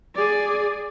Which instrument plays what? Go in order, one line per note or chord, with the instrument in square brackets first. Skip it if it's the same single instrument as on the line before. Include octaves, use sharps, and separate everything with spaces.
[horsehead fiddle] G#4 D5